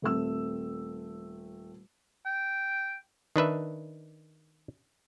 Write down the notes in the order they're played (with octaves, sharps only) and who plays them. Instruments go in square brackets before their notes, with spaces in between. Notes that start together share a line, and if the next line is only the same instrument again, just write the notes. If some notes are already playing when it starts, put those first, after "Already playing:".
[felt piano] D#1 A3 C4 E6
[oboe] G5
[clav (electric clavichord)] D#3 D4 B4 E5